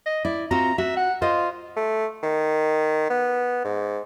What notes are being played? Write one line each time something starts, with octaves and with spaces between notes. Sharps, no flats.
D#5
E4 D5
C4 F4 F#4 A#5
F#4 E5
F#5
F4 C5 D#5
A3
D#3
B3
G#2